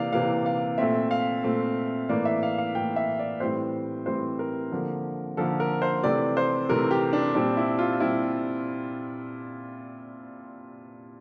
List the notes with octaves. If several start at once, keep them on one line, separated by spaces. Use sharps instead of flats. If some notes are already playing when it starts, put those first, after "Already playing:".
Already playing: C3 E3 A#3 D5 F5
C3 E3 A#3 F5
F5
A#2 A3 C4 E5
F5
A#2 A3 C4
A2 E3 A#3 D5
E5
F5
F5
A2 E3 A#3 G5
E5
D5
A2 E3 G3 C4 C5
A2 E3 G3 C4 C5
A#4
D3 F3 A#3
D3 F3 A#3 A4
A#4
C5
C3 E3 A3 C4 D5
C5
C3 E3 A3 C4 A#4
G4
D4
A#2 G3 C4 D4
E4
F4
A#2 G3 C4 E4